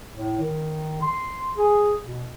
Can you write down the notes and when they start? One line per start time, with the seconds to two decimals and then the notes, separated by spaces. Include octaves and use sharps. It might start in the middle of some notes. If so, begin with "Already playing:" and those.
0.14 A2
0.40 D#3
1.01 C6
1.57 G#4
2.04 B2